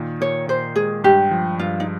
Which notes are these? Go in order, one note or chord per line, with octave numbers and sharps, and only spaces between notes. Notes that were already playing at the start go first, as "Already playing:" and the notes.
Already playing: A#2 D#3
A#2 C#5
A#2 C5
G#3 G#4
G2 G4
F3
G2 F4
D#4